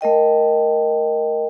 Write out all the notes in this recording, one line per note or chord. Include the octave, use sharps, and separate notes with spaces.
A3 A#4 D#5 G5